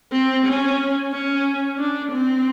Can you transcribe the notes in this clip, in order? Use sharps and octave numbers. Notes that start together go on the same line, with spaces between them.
C4
C#4
C#4
D4
C4